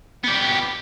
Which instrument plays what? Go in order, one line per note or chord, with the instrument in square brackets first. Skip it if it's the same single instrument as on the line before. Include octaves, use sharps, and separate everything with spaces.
[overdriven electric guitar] B3 G4